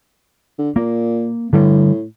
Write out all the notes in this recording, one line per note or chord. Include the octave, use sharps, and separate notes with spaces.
D3
A#2 A#3
A2 D3 G3